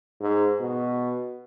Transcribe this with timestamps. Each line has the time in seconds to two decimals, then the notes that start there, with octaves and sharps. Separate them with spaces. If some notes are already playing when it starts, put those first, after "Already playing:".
0.21 G#2
0.60 B2